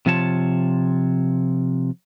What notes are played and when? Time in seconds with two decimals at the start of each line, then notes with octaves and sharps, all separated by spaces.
0.06 C3 F3 F4 C#5 A5